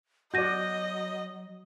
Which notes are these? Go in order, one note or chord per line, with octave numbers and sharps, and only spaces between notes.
F#3 F#4 D5 D#5 G6 A#6 D#7